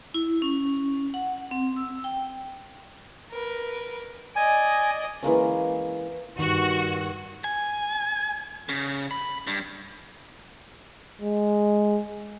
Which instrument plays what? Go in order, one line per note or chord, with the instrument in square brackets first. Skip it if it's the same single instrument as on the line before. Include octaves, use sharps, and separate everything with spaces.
[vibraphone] E4
C#4
F#5
C4
E6
G5
[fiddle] A#4 B4
[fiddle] D5 D#5 [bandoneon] G#5
[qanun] E3 G#3 A#3 C#4
[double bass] G2 [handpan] D#3 [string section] F#4
[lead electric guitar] G#5
C#3
B5
G2
[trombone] G#3